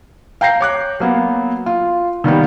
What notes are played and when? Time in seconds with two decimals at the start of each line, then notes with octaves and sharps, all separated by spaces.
0.41 F5 G5 A#5 G6 A#6 C7
0.61 C#5 D6 F#6
1.00 F#3 A#3 B3
1.66 F4
2.24 D#3 G3 A#3 B3